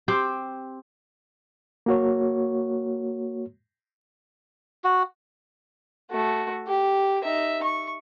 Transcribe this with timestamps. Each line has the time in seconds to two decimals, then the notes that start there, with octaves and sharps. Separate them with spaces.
0.08 C4 G4 C5 G5
1.86 A#3 F#4 C#5
4.84 F#4
6.11 A3 F#4
6.67 G4
7.23 D#4 E5
7.63 C#6